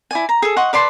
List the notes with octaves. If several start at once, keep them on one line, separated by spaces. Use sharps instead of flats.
E4 D5 G#5
A#5
G#4 A4
D#5 F#5 C6 C#6
B4 D5 A5 C6